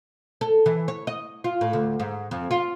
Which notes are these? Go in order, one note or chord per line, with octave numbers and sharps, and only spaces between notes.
A4
E3
C#5
D#5
F4
A2
D2
G#2
F2
F4